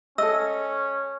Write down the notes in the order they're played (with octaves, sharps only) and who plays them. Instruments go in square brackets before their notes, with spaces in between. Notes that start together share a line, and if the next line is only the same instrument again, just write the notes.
[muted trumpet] C#4 [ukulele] A4 D#5 [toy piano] E6